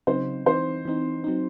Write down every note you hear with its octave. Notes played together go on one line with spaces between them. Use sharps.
C#3 F#3 C4 D#4 C5
E3 C4 D#4 C5
E3 C4 D#4
F#3 C4 D#4